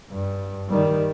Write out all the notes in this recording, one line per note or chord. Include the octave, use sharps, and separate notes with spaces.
G2
D#3 G3